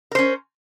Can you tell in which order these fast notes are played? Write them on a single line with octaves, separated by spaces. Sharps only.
A#4 C5 C#4